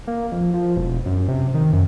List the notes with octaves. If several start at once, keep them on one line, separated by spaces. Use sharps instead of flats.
A#3
F2
F3
E1
F#2
C3
D#3
F#2